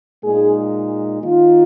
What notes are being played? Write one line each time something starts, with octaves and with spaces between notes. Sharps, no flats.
A#2 G#3 D#4 G#4
D#3 A#3 D#4 F4